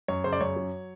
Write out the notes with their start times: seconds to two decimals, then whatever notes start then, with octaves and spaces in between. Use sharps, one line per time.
0.08 F#2 C#5
0.24 C#3 C5
0.32 D5
0.40 F#2 C#5
0.56 F#3